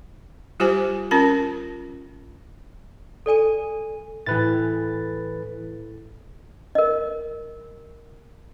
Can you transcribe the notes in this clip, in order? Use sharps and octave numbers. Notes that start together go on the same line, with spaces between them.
G3 F4 G4 C5 G#5 D6
C#4 F4 A#4 A5
A4 D5 G#5 D#7
A2 E3 G#4 B4 A6
A#4 D#5